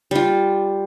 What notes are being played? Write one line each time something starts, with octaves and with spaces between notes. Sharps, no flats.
G3 F4